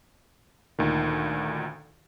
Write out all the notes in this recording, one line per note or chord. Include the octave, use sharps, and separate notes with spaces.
D2 A#2 D#3